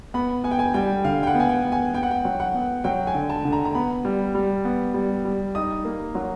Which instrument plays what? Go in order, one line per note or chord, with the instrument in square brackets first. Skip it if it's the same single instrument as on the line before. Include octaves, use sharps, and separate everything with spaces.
[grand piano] B3 [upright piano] B5
[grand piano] B3 [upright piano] G#5
[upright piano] G5
G#5
[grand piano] G3 [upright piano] G5
[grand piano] D3 [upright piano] F5
[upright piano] G5
F#5
[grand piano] B3 [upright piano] G#5
[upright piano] G5
[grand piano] B3
[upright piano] G#5
[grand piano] B3 [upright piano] G5
[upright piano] F#5
G5
[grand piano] F#3
[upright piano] F#5
[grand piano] B3
[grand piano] F#3 [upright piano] G5
[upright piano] G#5
[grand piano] D3
[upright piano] A5
[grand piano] D3
[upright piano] A#5
A#5
[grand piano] B3 [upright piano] B5
[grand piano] G3
G3
B3
G3
G3
[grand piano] D#4 [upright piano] D#6
[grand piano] A#3
F#3